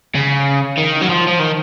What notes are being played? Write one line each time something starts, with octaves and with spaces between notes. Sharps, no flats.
C#3
D#3
F#3
F3
F3
D#3